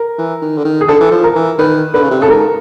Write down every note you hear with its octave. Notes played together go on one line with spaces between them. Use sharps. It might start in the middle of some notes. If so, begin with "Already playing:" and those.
Already playing: A#4
E3
D#3
D3
D#3
G#4
D3 A4
E3
F3
A#4
E3
D#3 B4
D3 B4
C#3
C3
C#3 A4
G#2 A#4